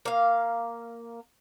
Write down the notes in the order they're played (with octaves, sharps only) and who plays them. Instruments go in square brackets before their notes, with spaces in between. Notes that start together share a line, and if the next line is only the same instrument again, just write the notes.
[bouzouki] A#3 F5